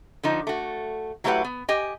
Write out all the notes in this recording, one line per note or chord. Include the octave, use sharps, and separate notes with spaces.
D3 F3 D#4
A3 F#4
F#3 A3 E4 G4 B4 F#5
B3
G4 D#5 G#5